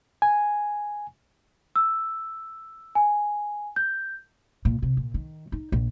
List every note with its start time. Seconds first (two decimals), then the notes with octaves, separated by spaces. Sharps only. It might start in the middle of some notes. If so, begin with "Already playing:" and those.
0.22 G#5
1.76 E6
2.95 G#5
3.76 G6
4.65 A#2
4.82 C3
4.97 A#2
5.14 D#3
5.52 D#4
5.72 A#1